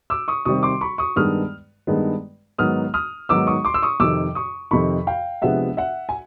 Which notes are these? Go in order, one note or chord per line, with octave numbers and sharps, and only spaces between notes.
D6 E6
C#6 D#6
C3 D#3 G3 C4 C#6 D#6
C6 D6
B5 C#6
C#6 D#6
G2 D#3 G#3 B3 D#6 F6
G2 D#3 G#3 B3
G#2 D#3 F#3 B3 D#4 D#6 F6
D#6 F6
G#2 D#3 F#3 B3 D#4 D6 E6
C#6 D#6
C6 D6
E6
C#6 D#6
F2 C3 D#3 D6 E6
C#6 D#6
F2 C3 D#3 B5 C#6
F5 G5
C3 F3 G#3 B3 D4 E5 F#5
E5 F#5
G#5